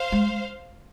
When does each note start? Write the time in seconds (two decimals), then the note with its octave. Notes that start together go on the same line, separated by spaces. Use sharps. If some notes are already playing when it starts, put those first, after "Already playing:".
Already playing: C5 F5
0.12 G#3